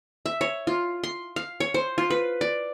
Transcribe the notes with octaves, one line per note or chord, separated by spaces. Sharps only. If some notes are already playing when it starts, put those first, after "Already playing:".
E5
C#5
F4
C6
F5
C#5
C5
F4
B4
D5